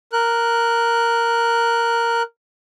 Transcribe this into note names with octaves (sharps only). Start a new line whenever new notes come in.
A#4 F#6